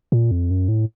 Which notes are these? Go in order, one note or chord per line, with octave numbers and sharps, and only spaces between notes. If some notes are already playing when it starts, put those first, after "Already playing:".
A#2
F2
F#2
A2